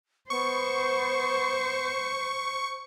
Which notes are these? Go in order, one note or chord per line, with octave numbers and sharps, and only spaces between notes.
B3 C5 C#6